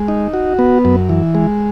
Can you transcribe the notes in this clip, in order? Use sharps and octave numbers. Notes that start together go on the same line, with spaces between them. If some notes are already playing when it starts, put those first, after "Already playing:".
Already playing: G#3
D#4
F#4
B3
F#2
E3
G#3